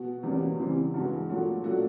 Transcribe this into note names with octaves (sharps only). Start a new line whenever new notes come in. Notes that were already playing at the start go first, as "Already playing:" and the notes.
Already playing: B2 F#4
E2 B2 G3 A#3 C#4
C#3 E3 G3 C4
G2 E3 G#3 F#4
A#2 F#3 A3 F#4
A#2 F#3 A3 D4 F#4